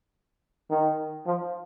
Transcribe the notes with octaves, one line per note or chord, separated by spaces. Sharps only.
D#3
F3